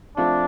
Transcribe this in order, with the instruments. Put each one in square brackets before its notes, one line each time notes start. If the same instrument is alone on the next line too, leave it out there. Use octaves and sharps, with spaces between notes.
[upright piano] F3 A3 C4 F4 [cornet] D4